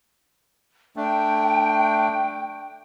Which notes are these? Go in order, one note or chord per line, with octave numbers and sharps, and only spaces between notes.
A3 D4 G5